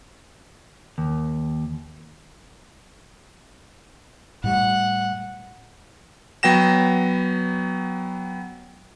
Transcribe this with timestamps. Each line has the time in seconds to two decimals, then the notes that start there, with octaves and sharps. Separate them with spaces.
0.98 D#2
4.44 A2 G3 F#5
6.43 F#3 B3 G5 A#6 E7